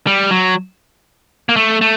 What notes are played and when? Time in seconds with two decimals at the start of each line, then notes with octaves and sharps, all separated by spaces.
0.07 G3
0.31 F#3
1.49 A#3
1.56 A3
1.81 A3